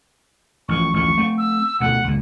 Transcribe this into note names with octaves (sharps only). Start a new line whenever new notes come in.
A1 F3 C#6
A1 D2 F3 C#6
A3 C4
E6
D2 B2 A3 F#5
C#2 A#2